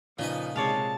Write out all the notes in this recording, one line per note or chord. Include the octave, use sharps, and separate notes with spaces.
A#2 C#3 F3 D#4 B4
C3 G#3 C#5 D5 F5 A5